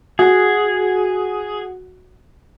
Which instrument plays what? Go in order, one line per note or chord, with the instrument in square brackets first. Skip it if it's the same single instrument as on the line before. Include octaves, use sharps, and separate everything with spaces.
[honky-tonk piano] F#4 [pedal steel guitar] G#4